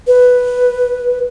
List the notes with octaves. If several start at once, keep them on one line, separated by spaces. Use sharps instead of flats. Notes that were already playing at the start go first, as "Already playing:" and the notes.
B4